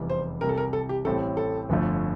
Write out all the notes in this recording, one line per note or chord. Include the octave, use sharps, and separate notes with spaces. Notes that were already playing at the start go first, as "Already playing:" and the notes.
Already playing: F1 E2 E3 G3
C5
C2 C3 G3 A#4
A4
A#4
A4
G4
A1 A2 G3 C4 A4
A4
G1 F2 D3 F3 A3